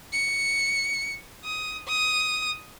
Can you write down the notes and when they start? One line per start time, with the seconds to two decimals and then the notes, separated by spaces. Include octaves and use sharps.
0.12 C#7
1.44 D#6
1.88 D#6